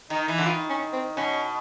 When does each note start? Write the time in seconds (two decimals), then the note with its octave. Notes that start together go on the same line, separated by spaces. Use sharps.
0.10 D#3 D#4
0.28 E3
0.38 D3
0.46 D#3 F4
0.70 C#4
0.93 C4
1.17 B2 C#4